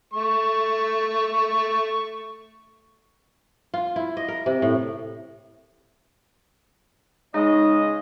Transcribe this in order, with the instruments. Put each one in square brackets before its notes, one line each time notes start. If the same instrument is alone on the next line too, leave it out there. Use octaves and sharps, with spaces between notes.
[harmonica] A3 C#6
[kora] F4
E4
D#5
A#4
C3
A2
[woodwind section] C#3 G#3 D#5 [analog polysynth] D#4